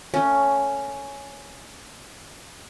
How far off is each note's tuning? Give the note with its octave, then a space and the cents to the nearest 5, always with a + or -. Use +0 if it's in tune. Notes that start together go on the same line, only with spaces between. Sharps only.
A3 +30 C#4 +5